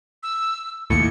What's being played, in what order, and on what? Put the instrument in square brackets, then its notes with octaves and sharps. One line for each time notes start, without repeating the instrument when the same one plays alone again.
[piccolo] E6
[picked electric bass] D#2 A2 [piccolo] C#7